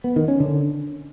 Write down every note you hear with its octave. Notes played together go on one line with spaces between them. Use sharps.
B3
D#3
C#4
D3